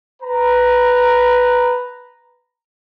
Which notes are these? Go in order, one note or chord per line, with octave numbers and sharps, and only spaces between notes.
B4 A#5